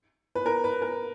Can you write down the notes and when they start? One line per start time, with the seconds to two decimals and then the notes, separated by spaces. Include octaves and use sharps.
0.35 B4
0.46 A#4
0.64 B4
0.82 A#4